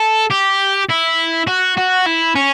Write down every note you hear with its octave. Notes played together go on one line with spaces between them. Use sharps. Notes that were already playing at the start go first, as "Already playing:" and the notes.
Already playing: A4
G4
E4
F#4
F#4
E4
C#4